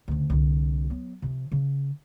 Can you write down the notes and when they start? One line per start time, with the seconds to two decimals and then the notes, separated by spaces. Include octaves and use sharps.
0.08 D2 C#3
0.30 C2 D3
0.90 F#3 B3
1.22 C3 F3
1.52 C#3